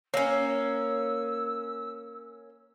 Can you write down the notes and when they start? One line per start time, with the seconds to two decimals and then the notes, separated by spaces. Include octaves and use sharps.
0.14 A#3 C#4 C#5 E6